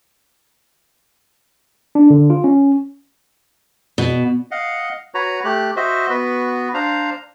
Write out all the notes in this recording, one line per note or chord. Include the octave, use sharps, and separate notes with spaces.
D4
D3
F4
C#4
B2
D#5 F5 F#5
F#4 B4 C#5 A#5
A3 G4 F#6
F#4 C5 D#5 E5
B3 F#4 B4
D4 C5 F5 A#5